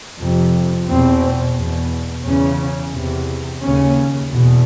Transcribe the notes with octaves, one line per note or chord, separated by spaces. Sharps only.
F2 C3
E2 B2 C4
E2 B2
E2 C#3 C#4
E2 C3
D#2 C#3 C#4
E2 B2